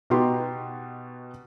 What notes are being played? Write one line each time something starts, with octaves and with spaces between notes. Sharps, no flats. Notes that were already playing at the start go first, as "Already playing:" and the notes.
B2 B3 D#4 F#4 G4 C6